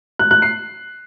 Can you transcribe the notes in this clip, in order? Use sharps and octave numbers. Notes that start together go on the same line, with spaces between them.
F#6
F#6
C7